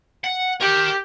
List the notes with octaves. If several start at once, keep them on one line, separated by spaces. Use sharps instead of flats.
F#5
G4 A#4 G5